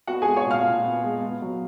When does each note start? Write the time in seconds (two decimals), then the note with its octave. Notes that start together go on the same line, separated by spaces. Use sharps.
0.07 B3 F#4 F#5
0.22 G#3 G#4 G#5
0.36 C#5 C#6
0.46 A#2
0.51 F5 F6
0.66 A#2
0.84 B3
1.03 G#3
1.22 B3
1.42 F#3